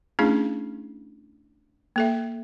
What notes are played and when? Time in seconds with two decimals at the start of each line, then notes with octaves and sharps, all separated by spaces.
0.19 A3 C#4 D4 E4 G#4
1.96 A#3 A4 E5